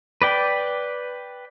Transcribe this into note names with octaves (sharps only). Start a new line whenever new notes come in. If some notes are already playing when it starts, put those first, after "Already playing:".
B4 D5 G5